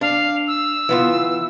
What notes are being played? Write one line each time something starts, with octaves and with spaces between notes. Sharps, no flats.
D4 F5
E6
E3 B3 F4